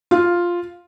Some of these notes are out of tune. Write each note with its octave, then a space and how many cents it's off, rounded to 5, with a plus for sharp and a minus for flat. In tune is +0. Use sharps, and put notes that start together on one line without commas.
F4 +0 F5 +0